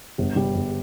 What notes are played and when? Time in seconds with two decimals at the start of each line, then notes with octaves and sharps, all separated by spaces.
0.18 G1
0.36 G3
0.55 G1